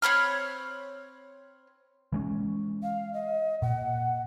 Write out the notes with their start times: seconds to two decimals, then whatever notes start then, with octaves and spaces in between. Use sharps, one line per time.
0.02 C4 C#5 B5 F6
2.12 E3 G#3 C#4
2.83 F5
3.14 D#5
3.62 A#2 F#5